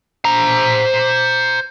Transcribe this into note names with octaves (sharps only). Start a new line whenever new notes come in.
C5 A#5